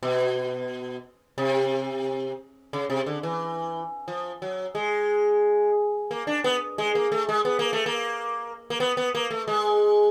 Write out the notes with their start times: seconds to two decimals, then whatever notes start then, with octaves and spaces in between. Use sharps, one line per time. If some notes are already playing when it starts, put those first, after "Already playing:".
0.03 B2
1.38 C3
2.73 C#3
2.90 C3
3.06 D3
3.23 E3
4.08 F3
4.42 F#3
4.75 G#3
6.11 A#3
6.27 D4
6.44 B3
6.78 G#3
6.95 A#3
7.12 A3
7.29 G#3
7.45 B3
7.59 A#3
7.73 A3
7.86 A#3
8.70 A#3
8.80 B3
8.97 B3
9.15 A#3
9.31 A3
9.48 G#3